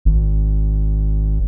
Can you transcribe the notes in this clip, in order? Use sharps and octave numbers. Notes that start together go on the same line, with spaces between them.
G#1